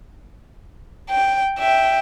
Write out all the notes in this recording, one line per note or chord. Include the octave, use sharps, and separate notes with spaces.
G5
E5 G5